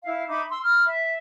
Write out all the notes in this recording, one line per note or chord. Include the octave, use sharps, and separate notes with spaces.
E4 F5
D#4 E5 B5 D6
C6 E6
B5 F6
E5